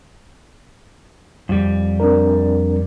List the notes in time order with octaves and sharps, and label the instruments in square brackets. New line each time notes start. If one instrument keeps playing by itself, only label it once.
[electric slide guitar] F2 G3
[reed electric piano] C4 D4 A#4